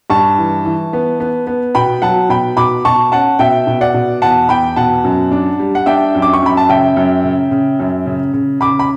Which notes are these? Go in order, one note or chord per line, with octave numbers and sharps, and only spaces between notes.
G2 A5 C#6
E3
E3
B3
B3
B3
B2 G5 B5
F#3 F#5 A5
B2 G5 B5
B2 B5 D6
B2 A5 C#6
C#4 F#5 A5
B2 E5 G5
B2
D5 F#5
B2
E2 F#5 A5
E2 G5 B5
B2 F#5 A5
F#2
D4
G3
F#5
D4 E5 G5
F#2
D6
C#6
F#2 B5
A5
C#3 E5 G5
F#2
C#3
C#3
F#2
C#3
C#3
C#3 B5 D6
B5